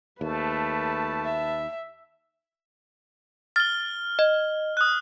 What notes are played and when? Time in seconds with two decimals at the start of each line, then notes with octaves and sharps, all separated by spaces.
0.21 D#2 A3 B4 A5
1.25 E5
3.56 F6 A6 G7
4.19 D#5
4.77 D#6 F#6